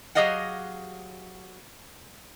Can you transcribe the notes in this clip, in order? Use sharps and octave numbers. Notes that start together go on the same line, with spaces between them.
F#3 G4 G#4 D#5 F5 F#5